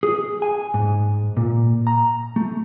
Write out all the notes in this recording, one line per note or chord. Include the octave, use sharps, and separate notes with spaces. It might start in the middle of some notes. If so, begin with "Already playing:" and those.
G#4
G#5
G#2
A#2
A#5
A3